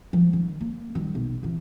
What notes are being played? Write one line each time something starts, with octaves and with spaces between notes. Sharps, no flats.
F3
D#3
A#3
D#3 G3
B1
C3 E3